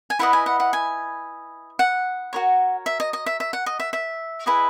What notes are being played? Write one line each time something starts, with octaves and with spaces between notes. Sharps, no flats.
G#5
E4 B4 D#5 F#5
G#5
F#5
F#5
G#5
F#5
F#4 A#4 C#5
E5
D#5
D#5
E5
E5
F#5
D#5
E5
E5
E4 G#4 B4 D#5